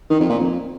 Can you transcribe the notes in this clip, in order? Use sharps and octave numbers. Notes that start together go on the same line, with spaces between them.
D#3
F2
A#2
F2